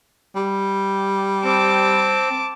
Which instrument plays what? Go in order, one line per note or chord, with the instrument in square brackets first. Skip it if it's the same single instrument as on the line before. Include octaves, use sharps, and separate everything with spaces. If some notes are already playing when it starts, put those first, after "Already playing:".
[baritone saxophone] G3
[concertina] C4 [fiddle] A5 D6